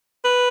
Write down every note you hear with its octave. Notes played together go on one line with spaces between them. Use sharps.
B4